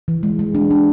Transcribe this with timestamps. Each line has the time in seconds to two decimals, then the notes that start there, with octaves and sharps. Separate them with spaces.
0.08 E3
0.23 G#3
0.39 G#3
0.55 D4
0.71 D4